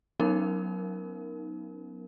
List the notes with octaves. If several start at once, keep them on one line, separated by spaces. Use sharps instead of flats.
F#3 B3 C#4 D#4 A#4